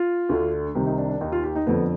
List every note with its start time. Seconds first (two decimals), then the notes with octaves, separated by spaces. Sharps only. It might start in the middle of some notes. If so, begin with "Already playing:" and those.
Already playing: F4
0.29 D2 D3
0.75 C2 C3 D#3 G4
0.86 D#4
0.98 D4
1.09 D4
1.21 D#2 D#3 D#4
1.32 F4
1.44 G4
1.55 D#4
1.66 F2 D3 B3